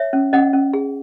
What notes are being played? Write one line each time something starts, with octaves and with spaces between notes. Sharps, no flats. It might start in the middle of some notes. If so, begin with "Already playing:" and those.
Already playing: C#5 E5
C#4
C#4 D#5 F#5
C#4
G#4